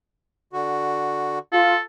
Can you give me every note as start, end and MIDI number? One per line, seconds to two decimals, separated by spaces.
0.53 1.39 50
0.53 1.39 66
1.52 1.73 65
1.52 1.80 69